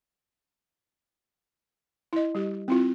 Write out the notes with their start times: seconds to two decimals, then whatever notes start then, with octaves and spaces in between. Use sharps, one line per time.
2.13 E4 D#5
2.35 G3 G4
2.68 C4 E4 F4